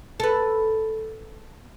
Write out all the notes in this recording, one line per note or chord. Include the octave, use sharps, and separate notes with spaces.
A4 B4